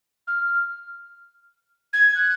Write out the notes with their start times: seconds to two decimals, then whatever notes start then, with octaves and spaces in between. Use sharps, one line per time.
0.27 F6
1.93 G#6
2.15 F#6